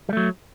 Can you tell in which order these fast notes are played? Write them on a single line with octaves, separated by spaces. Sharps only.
G3 A3 F#3